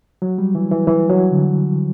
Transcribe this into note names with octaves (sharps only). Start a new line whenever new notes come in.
F#3
G3
E3
E3
E3
F#3
D3